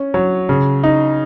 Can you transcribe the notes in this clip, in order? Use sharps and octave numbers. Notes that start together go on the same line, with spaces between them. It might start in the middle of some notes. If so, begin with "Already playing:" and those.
Already playing: C#4
F#3
C#3
D#4